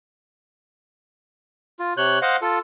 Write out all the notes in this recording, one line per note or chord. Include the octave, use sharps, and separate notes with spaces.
F4
C3 C#5 F#6 G6
C5 D#5 F5 F#5
F4 A4